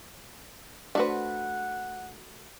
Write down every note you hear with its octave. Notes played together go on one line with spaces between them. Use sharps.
A3 D4 F#4 B4 C5 F#5